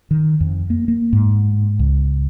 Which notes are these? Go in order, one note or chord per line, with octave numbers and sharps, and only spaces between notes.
D#3
F2
A#3
A#3
G#2
C#2